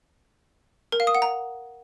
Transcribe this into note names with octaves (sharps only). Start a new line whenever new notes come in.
A#4
F5
D#6
F#5
A#5